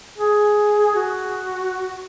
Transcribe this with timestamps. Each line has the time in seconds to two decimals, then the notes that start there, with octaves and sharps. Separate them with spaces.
0.18 G#4
0.95 F#4